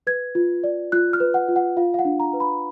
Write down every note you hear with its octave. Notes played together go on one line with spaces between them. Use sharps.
B4 G#6
F4
D5
F4 F#6
F6
B4
F#5
F4
F#5
F4 F5
F5
F#5
D4
A#5
B4
B5